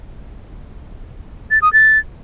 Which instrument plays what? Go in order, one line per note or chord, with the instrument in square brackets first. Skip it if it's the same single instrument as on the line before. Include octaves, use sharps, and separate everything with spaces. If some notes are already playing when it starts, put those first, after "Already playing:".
[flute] A6
D#6
A6